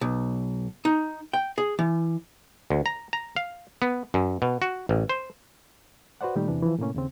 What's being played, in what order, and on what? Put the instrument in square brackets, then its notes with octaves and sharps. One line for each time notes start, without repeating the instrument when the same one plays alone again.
[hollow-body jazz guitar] B1
D#4
G5
G#4
E3
[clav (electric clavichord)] D2
A#5
A#5
F5
B3
F#2
B2
F#4
A1
C5
[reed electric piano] F#4 B4 C5 D5 F#5
A#2 D#3 G3 A3 D#4 G4
E2 C3 E3 D4
E3 F3
A2 C3 A#3 C#4
D#2 C#3 C4